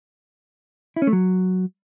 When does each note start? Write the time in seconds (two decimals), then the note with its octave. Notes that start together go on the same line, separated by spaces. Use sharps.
0.96 E4
1.02 C#4
1.07 A3
1.13 F#3